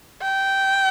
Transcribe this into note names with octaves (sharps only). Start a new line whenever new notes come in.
G5